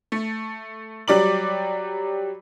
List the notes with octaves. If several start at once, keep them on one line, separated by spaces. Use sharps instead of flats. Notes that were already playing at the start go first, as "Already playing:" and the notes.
A3
F#3 G3 D5 D6 F#7